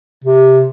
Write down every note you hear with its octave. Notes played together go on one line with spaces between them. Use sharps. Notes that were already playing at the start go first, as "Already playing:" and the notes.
C3